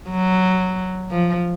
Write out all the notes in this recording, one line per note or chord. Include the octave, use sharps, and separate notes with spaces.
F#3
F3